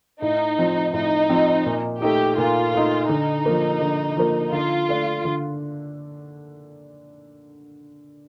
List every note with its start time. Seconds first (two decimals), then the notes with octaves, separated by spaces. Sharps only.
0.22 A2 D#4
0.58 F3 C4
0.94 A2 D#4
1.29 F3 C4
1.66 A#2
2.01 A3 D#4 G4
2.38 A#2 F4
2.74 A3 D#4
3.09 D3 D#4
3.46 F3 A#3
3.81 D3
4.17 F3 A#3
4.52 D3 F4
4.89 A3 D4
5.25 D3